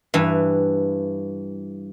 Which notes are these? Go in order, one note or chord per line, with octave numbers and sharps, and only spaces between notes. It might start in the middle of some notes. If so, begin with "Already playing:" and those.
G2 E3